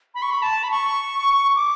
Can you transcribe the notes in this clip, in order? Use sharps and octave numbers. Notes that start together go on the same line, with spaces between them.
B5
C#6
B5
A5
B5
C#6
D6